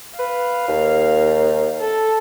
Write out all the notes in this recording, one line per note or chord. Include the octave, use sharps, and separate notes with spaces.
B4 F5
D#2
A4